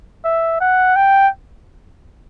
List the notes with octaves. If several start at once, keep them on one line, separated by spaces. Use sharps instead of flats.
E5
F#5
G5